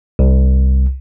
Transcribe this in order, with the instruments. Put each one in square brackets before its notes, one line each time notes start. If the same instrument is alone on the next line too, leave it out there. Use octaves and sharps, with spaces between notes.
[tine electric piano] C2